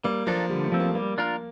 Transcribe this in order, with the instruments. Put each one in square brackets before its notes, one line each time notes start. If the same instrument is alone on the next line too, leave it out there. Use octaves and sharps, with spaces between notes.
[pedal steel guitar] G3 [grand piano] A#3
[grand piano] F3 [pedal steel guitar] A#3 D4 A4
[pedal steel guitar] D3 [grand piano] G3
[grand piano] A3
[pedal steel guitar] F3 C4
[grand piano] A#3
[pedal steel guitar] G3 [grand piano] A#3
[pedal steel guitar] D4 F4 A#4